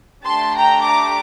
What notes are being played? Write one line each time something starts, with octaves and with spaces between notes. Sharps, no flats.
A3 D4 G4 A5 C6
G5 A#5
A#5 D6